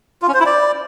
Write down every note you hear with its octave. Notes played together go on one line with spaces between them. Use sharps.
F4
C#4
C5
E4
D5